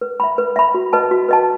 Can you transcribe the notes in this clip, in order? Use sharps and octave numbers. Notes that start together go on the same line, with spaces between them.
B4
E5 B5
B4
E5 B5
F#4
B4 D#5 A5
F#4
B4 D#5 A5